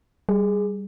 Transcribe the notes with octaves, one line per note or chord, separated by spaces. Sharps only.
G3 G#4